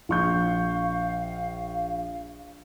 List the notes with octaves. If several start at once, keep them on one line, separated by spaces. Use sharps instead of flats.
A#1 F5 C#6 G6